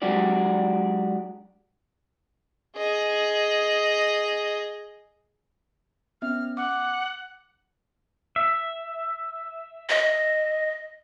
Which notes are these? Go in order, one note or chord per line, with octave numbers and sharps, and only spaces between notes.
F#3 G#3 D4 F#4 G4 D5
G#4 D#5
B3 C#4 E5 F6
F#5 D6
E5
D#5